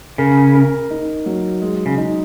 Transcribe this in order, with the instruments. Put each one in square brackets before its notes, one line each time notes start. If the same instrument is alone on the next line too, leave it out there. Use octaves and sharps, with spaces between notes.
[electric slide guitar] C#3 [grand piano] A#4
[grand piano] A#4
D#4
F#3
G#3
[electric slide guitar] C#3
[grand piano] D#4